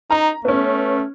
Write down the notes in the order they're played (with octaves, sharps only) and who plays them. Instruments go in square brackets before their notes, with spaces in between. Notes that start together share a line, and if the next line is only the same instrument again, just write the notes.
[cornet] D#4 [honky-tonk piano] A#5
[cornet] A3 [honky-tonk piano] B3 C#4